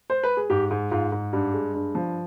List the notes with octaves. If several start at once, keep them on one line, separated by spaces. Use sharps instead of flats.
C5
B4
G#4
G#2 G4
G#2
G#2 F4
G#2
G2 G4
G#3
G2
F3